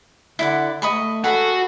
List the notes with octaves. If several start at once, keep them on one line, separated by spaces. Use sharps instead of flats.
D3 E4 D5 F#5
A3 D#5 B5 C#6
F#4 G#4 A4 B4 B5